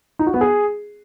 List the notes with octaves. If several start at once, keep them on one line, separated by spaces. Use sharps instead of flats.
D#4
F#4
B3
G#4